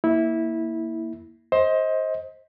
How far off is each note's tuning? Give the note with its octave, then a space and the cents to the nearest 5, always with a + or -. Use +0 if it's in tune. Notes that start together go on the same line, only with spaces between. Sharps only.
A#3 +0 E4 -15
C5 +15 D#5 +25